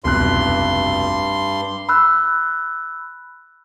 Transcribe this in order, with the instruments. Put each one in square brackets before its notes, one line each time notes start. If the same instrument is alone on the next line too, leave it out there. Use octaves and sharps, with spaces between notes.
[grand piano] F1 B1 F#6 [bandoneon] G2 C6
[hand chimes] B5 E6 F#6